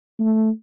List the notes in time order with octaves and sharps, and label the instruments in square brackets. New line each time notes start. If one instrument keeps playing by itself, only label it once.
[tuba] A3